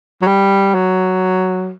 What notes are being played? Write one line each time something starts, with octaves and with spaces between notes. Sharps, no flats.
F#3
G3
F#3